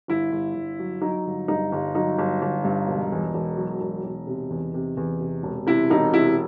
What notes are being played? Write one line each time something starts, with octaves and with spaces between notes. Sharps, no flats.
G1 E4
G1
G1
F#3
F#3 D#4
G1
G2 D#4
G1
F#3 D#4
G1
G1
G2
E1
E2
E1
F#3
E1
E1
C3
E2
C3
E2
C3
E1
C3 E4
E1 D#4
C3 E4